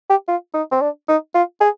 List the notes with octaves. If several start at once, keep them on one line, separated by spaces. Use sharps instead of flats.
G4
F4
D#4
C4
D4
D#4
F4
G#4